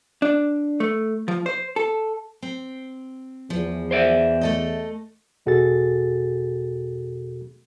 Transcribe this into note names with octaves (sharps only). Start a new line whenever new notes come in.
D4
A3
F3
C5
A4
C4
E2 F3
C5 D5 E5
A3 A4 D#5
E2 B2 F#4 G#4 A4 A6